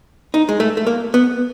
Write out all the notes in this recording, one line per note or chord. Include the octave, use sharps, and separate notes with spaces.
D#4
G#3
A3
A3
A#3
B3